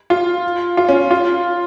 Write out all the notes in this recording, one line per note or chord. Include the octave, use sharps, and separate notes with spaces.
F4
F4
C#4
F4